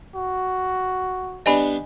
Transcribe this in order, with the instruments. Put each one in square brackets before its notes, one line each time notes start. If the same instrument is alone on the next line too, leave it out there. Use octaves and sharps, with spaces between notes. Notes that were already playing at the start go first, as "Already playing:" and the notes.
[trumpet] F#4
[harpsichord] G3 B3 D4 [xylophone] D#5 G#5 B5